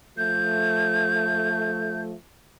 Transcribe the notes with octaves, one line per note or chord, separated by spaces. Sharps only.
F3 A3 G6